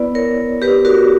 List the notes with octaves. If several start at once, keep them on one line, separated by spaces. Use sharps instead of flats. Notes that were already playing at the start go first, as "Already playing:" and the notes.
Already playing: B3 E4 B4 D5
A#4 C#5
G4 B4
F#4 A#4